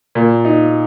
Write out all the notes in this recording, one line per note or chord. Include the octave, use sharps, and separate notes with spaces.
A#2
D#4